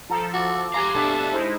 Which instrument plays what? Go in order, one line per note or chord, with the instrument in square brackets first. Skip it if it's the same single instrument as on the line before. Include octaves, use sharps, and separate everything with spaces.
[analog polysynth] F3 A4 [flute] A#5
[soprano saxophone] F#4 [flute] D6
[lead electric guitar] G4 F5 [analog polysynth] G#5 C6 [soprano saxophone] A#5
[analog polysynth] B2 D4 E5 [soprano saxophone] A4
[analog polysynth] G#3 D#4 E4 [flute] C5